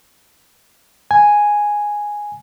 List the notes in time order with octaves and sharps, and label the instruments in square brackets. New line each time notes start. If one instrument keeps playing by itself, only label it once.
[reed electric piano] G#5